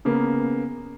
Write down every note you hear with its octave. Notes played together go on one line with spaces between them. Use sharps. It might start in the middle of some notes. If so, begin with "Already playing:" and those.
C#3 A#3 B3